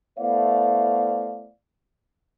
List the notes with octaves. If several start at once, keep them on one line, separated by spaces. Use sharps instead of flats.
A3 B3 E4 C5 D5 F5